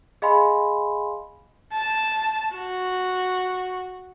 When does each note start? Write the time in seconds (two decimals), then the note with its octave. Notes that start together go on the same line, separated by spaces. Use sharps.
0.22 G#4 D#5 F5 G#5 B5 C6
1.73 A5
2.55 F#4